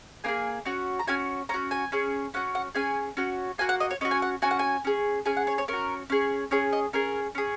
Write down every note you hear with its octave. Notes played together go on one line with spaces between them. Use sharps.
A#3 D#4 G#4 G#5
C#4 F#4
A#5
C#4 F#4 G#5
C#4 F#4 A#5
G#5
C#4 G#4
C#4 F#4 F#5
F#5
C#4 G#4 G#5
C#4 F#4
A#3 F#4 G#5
F#5
D#5
C#5
C#4 F#4 D#5
G#5
F#5
C#4 F#4 G#5
F#5
G#5
C#4 G#4
C#4 G#4 G#5
F#5
C#5
C#5
C#4 F#4 A#4
C#4 G#4
C#4 G#4 C#5
D#5
C#4 G#4 A#4
C#4 G#4